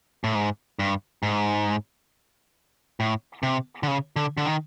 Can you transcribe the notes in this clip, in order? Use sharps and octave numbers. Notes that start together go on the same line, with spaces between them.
A2
G#2
G2
G#2
A2
C3
D3
C#3
D3
D3
D#3